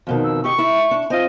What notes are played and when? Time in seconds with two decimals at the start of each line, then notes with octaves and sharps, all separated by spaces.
0.07 F2 B2 D#3
0.24 E6
0.44 C#4 G4 D#5 C#6
0.59 E4
0.91 D4
1.10 C4 F4 D#5